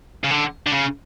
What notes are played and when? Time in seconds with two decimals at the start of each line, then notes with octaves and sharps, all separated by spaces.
0.24 C#3
0.31 D3
0.67 D3
0.72 C#3